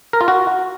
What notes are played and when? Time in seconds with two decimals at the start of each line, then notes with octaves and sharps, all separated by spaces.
0.13 A#4
0.21 F4
0.28 F#4